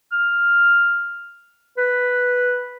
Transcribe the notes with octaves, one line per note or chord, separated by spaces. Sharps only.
F6
B4